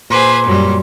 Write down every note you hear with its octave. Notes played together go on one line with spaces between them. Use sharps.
A#2 G#4 B4 C5
F#2 F#3 G3